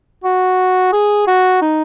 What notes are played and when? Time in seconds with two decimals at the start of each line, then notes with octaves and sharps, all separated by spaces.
0.24 F#4
0.93 G#4
1.27 F#4
1.62 D#4